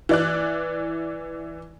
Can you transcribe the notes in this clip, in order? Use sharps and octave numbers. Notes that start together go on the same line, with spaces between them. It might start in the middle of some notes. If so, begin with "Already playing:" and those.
E3 D5 F#6